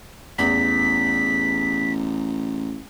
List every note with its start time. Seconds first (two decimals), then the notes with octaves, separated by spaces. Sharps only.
0.38 A1 E2 B6